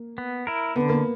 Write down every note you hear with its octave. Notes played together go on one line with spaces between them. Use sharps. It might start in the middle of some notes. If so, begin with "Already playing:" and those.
Already playing: A#3
B3
E4 A#4
D3 B3
A#3